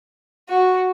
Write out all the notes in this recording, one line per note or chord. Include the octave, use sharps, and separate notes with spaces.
F#4